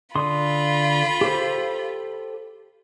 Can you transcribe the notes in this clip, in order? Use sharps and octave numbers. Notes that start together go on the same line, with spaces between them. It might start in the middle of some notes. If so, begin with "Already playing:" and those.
D3 F4 B5 C6 D#6
G4 A4 C5